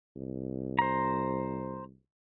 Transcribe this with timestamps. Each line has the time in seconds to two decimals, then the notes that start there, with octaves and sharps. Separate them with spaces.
0.16 C2
0.79 C5 A#5